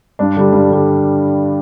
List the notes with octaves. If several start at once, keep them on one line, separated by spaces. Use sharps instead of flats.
G2 D4
D3 G3
G2 D4
D3 G3